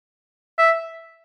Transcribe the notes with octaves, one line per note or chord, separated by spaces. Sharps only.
E5